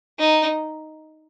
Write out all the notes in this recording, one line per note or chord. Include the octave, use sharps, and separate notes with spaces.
D#4